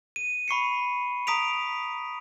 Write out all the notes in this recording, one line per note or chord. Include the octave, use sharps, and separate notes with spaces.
D#7
B5 C#6 C7 C#7
A#5 D#6 B6 D7 F7